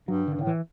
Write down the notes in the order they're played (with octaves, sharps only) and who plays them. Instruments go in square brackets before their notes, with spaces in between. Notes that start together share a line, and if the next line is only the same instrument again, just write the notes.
[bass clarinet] G2 [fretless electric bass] F#3
[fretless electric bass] D3
[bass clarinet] G2
[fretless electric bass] D3
[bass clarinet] A2
[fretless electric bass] E3